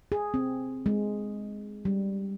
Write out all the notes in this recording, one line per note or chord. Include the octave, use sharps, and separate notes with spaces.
G#4
C4
G#3
G3